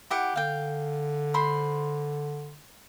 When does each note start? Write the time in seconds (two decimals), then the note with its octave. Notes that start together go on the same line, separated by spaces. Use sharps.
0.10 E4 G4 F#5
0.36 D3 F5 G5
1.34 C5 B5 C6